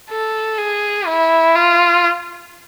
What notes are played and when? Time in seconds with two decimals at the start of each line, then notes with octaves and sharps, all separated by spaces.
0.11 A4
0.58 G#4
1.07 E4
1.55 F4